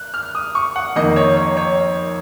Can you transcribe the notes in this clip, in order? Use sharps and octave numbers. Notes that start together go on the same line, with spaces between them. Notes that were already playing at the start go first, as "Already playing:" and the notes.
Already playing: F#6
F6
D#6
C#6
F#5
F2 D#3 A#3 D#5
C#5
C#5
C#5